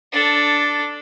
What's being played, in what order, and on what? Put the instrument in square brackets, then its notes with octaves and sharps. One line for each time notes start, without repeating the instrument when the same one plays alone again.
[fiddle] D4 A4